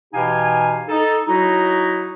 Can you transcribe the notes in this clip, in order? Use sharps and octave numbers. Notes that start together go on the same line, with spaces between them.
B2 E3 D#4 G4 F5 G#5
D#4 A4
F#3 D#4 E4 F#4